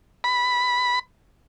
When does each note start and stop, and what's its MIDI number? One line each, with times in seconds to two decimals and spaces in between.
0.24 0.99 83